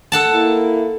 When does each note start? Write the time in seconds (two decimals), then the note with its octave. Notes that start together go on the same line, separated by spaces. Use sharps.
0.12 A4 F#5 A5
0.34 A#3 E4